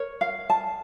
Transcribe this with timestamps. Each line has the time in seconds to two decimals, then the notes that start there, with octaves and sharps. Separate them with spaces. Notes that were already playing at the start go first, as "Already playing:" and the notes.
Already playing: A#4 C#5
0.21 F5
0.50 A5